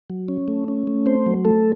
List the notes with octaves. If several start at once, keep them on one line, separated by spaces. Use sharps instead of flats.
F#3
C#4
A3
C#4
A3
C4 C5
F#3
A3 A4